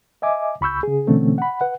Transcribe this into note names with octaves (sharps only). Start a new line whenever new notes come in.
D#5 E5 G#5 D6
C#2 B5 C#6 E6 G6
C#3 G#4
B2 D3 E3 A3 C4 C#4
F#5 B5
B4 F#5